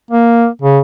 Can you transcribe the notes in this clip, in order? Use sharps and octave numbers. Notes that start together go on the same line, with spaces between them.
A#3
C#3